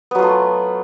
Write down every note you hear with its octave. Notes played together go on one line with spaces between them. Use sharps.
F#3 A3 B3 F4